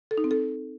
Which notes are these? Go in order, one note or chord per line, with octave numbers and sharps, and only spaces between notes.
A4
D#4
C4
A4